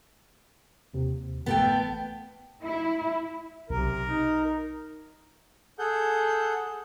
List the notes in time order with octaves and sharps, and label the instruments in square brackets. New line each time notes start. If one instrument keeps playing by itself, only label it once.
[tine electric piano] D#2 C3
[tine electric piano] A1 A3 [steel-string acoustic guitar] B3 A4 G5
[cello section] E4
[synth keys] B1 [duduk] C3 [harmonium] A#4
[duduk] D#4
[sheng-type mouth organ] G#4 A4 F#5 G6